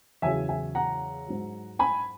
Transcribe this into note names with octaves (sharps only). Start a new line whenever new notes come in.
E2 C#3 F#3 E5 G#5
E5 G#5
F#5 A#5
G#2 F#3
G#5 B5